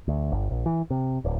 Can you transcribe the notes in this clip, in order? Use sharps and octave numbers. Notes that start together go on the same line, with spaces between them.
D2
G1
A#1
E3
C3
D1